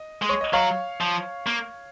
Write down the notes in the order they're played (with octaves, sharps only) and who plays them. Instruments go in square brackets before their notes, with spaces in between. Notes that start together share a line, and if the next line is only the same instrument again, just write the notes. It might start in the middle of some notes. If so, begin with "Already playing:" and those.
Already playing: [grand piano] D#5
[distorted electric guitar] G#3
[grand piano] C#5
D#5
[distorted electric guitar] F#3 [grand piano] C#5 F5
[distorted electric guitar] F3
A#3